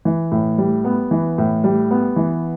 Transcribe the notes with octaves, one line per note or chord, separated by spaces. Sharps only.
E3
A2
G3
B3
E3
A2
G3
B3
E3